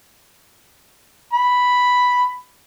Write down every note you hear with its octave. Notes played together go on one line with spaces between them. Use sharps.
B5